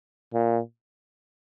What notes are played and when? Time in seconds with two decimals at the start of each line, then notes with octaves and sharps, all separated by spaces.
0.34 A#2